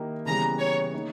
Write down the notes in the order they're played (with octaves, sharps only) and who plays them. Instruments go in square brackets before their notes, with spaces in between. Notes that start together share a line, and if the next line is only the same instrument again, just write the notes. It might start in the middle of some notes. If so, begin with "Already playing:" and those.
Already playing: [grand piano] D#3 A#3 E4 G4
[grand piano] C#3 E3 G3 B3 [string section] A#5
[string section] C#5
[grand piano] A#3 D#4 A#4